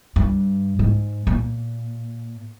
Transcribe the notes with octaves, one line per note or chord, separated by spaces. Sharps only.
G2
G#2
A#2